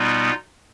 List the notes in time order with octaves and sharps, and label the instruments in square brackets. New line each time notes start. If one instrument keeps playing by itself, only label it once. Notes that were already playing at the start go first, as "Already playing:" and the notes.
Already playing: [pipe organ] B2 G3 B3 D#4 F4